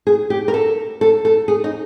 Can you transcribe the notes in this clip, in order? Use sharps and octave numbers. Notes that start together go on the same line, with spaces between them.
G#4
G4
A#4
A4
A4
A4
G#4
D#4